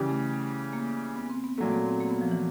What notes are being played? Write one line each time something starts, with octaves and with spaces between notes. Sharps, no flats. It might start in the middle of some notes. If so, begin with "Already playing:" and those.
Already playing: C#3 E3 G3
A3
A#3
B3
C4
B3
A#2 F#3 A3 A#3
B3
C4
A#3
B3
F3
E3